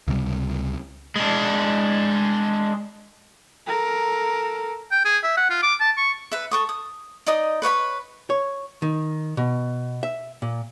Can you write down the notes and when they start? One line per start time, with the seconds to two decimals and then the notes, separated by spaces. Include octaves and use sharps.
0.07 C#2 C3 F#3 G3
1.16 G#3 D4
3.68 A4 A#4
4.92 G5
5.05 G#4
5.23 E5
5.37 F#5
5.50 F4
5.63 D6
5.80 A5
5.97 C#6
6.32 B4 E5
6.51 A4 C#6 D#6
6.69 D#6
7.26 D#4 D5 D#5 D#6
7.62 B4 C#5 E5 B5
8.30 C#5
8.82 D#3
9.37 B2
10.03 E5
10.42 A#2